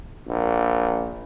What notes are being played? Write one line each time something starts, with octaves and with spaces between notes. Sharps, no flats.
A#1